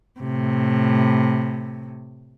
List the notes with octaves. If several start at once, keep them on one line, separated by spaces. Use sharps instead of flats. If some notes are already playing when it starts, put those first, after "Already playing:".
A2 C3